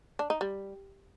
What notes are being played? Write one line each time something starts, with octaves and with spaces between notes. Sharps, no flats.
D4
D#4
G3